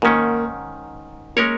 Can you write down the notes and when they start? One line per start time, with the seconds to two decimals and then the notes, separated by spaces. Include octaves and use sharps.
0.02 G#2 D#3 A#3 C#4
1.36 G#3 A#3 C#4 A#4 C#5